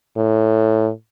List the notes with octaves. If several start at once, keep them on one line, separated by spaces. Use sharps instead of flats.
A2